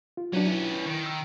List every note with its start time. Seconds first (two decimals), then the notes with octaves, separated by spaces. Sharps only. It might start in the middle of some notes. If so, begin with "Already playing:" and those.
0.17 F4
0.33 F#3 C#4 D4 B4
0.46 E4
0.86 D#3
1.06 E6